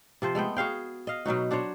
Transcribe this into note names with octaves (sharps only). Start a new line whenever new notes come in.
C3 F3 C5
G#3 A3 B3 G5
F#4 G#4 F5 G5
D#5 F5
B2 F#3 D#4 F#4
D4 F#4 C5 C#5